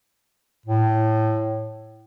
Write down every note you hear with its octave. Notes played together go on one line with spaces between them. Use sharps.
A2